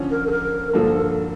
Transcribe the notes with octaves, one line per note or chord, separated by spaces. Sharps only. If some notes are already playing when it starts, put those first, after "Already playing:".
Already playing: D3 F3 C#4
A#4
A4
A#4
G2 D3 F3 A#3 A4